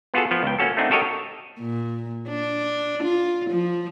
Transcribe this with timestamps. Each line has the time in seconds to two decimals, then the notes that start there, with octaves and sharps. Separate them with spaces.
0.14 B3 F4 F#4 G#4 A4
0.31 F3 B3
0.43 C#2 G5
0.59 A#3 C#4 F#4 A4
0.77 A3 C4 D4 D#4 F#5
0.91 F#4 G4 A4 A#4 C#5 D#5
1.59 A#2
2.28 D4
3.03 F4
3.50 F3